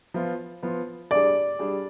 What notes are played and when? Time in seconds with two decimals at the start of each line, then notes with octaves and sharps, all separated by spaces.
0.14 F3 B3 F4
0.63 F3 B3 F4
1.10 G3 D4 G#4 D5
1.59 G3 D4 G#4